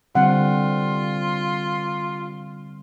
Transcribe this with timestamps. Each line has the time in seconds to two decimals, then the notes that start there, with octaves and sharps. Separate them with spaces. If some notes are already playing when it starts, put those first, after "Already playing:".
0.15 D3 G3 C4 F4 F#5